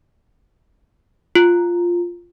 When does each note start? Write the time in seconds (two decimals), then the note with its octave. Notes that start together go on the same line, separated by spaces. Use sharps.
1.35 F4